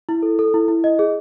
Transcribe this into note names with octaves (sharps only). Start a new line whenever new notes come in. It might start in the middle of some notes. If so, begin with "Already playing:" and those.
E4
A4
A4
E4
E4
D#5
G#4